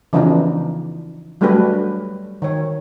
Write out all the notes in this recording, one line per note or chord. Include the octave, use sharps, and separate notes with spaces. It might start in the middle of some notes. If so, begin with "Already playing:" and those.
C#3 E3 F3 B3 D4 D#4
F#3 G3 A3 D4 G4 B4
D#3 C#5